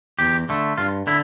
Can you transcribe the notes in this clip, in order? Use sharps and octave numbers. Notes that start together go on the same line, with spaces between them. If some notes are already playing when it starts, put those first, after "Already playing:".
E2 G4
D3 A3
G2 F4
D3 E4